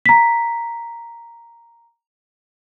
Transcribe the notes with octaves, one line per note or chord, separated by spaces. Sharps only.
A#5 B6